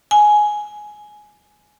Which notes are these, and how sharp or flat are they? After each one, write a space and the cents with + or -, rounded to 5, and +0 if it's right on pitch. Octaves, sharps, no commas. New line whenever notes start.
G#5 +10